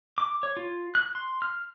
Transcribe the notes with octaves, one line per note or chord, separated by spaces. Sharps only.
D6
C#5
F4
F#6
C6
F6